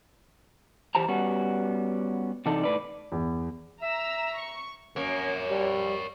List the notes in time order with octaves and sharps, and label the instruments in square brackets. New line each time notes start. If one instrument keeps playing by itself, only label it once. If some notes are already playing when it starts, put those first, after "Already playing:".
[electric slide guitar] E3 G4 C5 A5 A#5
G3 B3 C#4 F#4
C3 E3 D4 D#4 A4
A2 B4 D5
[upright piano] E2
[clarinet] E5 [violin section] A#5 E6
[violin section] C#6
[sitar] F#2 A#3 [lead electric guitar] A#4 C#5
[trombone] G3